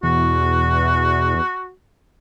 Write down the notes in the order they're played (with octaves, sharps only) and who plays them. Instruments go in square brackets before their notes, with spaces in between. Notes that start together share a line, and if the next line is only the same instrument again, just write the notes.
[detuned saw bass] E2 [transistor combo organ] B2 E3 [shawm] F#4